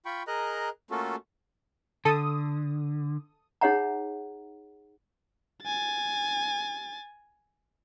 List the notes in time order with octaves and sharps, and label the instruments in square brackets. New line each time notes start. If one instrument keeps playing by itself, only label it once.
[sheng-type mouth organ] F4 G5 B5 C#6
G#4 A#4 D#5 A#5 F#6
A3 A#3 C#4 F4 F#4 A4
[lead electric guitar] D3 [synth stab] A4 D#6
[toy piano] D#4 G#4 C#5 E5 F#5 A#5
[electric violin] G#5 A6